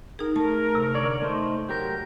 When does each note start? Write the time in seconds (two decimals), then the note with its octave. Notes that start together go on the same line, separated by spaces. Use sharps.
0.19 D#4 G#4 A#4
0.36 A3 A#4 A5
0.75 C3
0.94 D3 C#5 D5
1.22 A3 D#4 C5
1.69 F#3 G4 A#4 G6